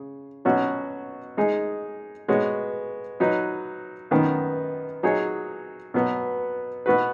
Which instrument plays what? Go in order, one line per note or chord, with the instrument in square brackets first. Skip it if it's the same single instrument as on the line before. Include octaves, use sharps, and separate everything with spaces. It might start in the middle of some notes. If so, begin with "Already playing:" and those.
Already playing: [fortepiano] C#3
B2 F#3 C#4 F#4
G#3 D#4 G#4
G#3 B3 F#4 C#5
F#3 D#4 B4
F#2 D#3 B3
F#3 D#4 G#4 C#5
B2 F#3 B3
B2 B3 F#4 B4